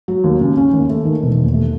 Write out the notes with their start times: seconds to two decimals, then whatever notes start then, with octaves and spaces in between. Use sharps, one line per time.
0.08 F#3
0.24 D#2
0.41 C#3
0.57 C#4
0.73 D#2
0.90 A3
1.05 D#3
1.22 E1
1.38 D#2
1.54 A3